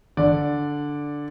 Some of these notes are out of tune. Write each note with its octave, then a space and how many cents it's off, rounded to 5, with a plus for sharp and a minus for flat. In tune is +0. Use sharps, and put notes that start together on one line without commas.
D3 -5 D5 +0